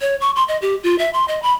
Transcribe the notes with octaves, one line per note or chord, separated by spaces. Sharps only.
C#5
C#6
C6
D#5
G4
F4
E5
C6
D#5
B5